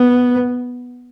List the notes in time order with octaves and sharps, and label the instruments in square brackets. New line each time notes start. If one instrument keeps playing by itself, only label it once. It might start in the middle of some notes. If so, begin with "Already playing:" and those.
Already playing: [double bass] B3